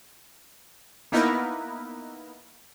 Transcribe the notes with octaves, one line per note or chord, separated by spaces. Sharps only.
A#3 B3 D#4 E4 A#4 B4